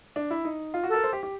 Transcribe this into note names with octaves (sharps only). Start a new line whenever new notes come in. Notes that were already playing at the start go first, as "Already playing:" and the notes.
D4
E4
D#4
F4
F#4
A4
A#4
C5
G4
G4